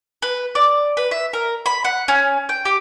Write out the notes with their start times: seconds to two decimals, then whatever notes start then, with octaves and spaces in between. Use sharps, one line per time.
0.22 B4
0.55 D5
0.97 B4
1.11 E5
1.33 A#4
1.66 B5
1.84 F#5
2.08 C#4
2.49 G5
2.65 G4